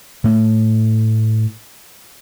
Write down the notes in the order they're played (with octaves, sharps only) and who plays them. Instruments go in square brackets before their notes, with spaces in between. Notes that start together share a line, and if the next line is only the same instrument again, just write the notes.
[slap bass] A2 A3